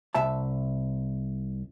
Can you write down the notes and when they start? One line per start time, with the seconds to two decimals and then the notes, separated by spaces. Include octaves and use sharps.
0.15 C2 E5 A5